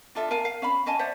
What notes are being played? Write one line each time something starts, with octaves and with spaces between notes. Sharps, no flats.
D4 F4 A4 E5
A#4 F5 G#5 A5
F5
C#4 F5 B5
C#4 D#5 G#5 A5
C5 D5 E5 F#5